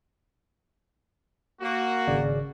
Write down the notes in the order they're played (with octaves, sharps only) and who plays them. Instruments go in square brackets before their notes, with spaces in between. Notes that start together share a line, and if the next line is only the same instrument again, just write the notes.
[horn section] A#3 F#4
[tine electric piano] G#1 C#3 D5